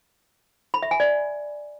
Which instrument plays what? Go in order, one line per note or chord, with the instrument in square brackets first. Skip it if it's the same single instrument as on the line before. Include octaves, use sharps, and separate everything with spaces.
[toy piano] B5
E5
G#5
D5